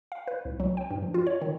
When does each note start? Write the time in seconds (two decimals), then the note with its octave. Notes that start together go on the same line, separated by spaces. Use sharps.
0.12 F5
0.27 B4
0.45 C2
0.60 F#3
0.77 G5
0.90 G2
1.02 F3
1.14 F4
1.27 C#5
1.42 D#3